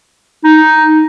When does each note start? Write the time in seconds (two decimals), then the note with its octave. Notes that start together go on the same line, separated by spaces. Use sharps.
0.44 D#4